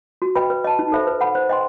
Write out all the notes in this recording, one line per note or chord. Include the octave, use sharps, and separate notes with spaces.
F#4
B4 D#5 G5 B5
B4
D#5 A5
D#4
A4 C5 E5 B5
B4
F#5 B5
C5
D#5 G5 C6